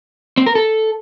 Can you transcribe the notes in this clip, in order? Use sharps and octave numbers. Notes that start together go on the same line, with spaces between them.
C4
A#4
A4